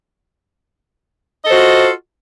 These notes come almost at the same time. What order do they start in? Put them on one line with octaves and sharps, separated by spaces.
D#5 A4 C5 F#4 F4